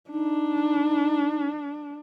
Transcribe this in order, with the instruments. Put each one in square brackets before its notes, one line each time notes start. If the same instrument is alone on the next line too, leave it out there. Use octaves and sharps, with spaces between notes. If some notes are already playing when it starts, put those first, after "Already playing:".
[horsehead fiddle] D4 [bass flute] D#4